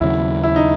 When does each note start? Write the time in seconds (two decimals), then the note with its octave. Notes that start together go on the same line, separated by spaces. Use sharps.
0.01 D#2 C#3 F#3 E4
0.43 E4
0.56 D#4